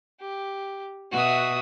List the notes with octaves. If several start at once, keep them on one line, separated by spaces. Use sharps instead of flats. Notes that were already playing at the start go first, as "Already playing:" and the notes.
G4
B2 F#4 E5 D#6